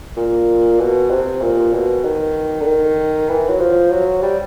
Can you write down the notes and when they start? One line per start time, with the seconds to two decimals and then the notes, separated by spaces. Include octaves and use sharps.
0.16 A#2
0.79 B2
1.10 C3
1.41 A#2
1.73 B2
2.04 D#3
2.61 D3
2.67 D#3
3.29 E3
3.49 F#3
3.60 F3
3.91 F#3
4.22 G3